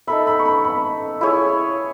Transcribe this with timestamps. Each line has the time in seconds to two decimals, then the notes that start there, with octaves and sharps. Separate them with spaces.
0.07 D#4 A4 E5 B5
0.27 B5
0.39 C#6
0.45 B5
0.65 B5
1.21 E4 G#4 C#5